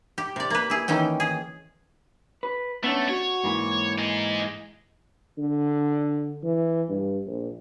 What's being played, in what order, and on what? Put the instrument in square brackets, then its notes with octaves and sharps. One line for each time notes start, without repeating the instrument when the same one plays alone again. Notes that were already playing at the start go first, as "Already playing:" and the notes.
[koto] G4
C3 D5
A#3 B4
E4 G#4
D#3 E3 C#4 G5
G#4
[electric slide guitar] B4
[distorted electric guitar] A3 [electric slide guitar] B3 C#4 D4
[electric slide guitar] F#4 [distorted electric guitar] C#5
[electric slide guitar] G#2 E3 A#3
[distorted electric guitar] D#4 G#4
[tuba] D3
E3
G2
A#1